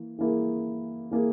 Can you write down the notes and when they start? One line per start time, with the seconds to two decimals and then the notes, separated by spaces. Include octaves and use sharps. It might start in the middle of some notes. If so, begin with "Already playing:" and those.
Already playing: E3 A#3
0.18 E3 A#3 E4 G#4
1.11 E3 A#3 E4 G#4